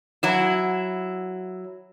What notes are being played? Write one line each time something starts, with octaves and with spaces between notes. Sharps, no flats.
F#3 E4